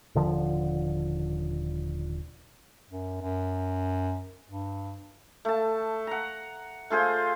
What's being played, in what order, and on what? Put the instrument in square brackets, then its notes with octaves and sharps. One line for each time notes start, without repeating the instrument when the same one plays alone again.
[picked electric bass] D#1 D3 F3
[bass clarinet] F#2
F#2
G2
[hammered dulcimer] A3 A5
F#5 A#5
A3 F4 G#4 C5